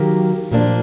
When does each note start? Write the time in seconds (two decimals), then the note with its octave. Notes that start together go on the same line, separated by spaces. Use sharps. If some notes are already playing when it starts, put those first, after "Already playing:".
Already playing: D#3 F#3 A#3 G4
0.52 A#2 F3 A#3 D4